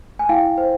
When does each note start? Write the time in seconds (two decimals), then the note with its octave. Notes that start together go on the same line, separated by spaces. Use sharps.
0.19 G#5
0.29 E4 F5 G5
0.58 C5